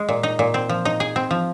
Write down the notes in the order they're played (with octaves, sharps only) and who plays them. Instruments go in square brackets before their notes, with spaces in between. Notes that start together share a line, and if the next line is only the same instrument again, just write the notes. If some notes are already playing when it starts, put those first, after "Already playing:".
Already playing: [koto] G#3
A#2
D#4
A#2
C4
F3
D#4
G#4
C4
F3